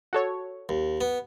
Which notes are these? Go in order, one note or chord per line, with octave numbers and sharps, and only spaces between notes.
F#4 A4 C#5
D#2
B3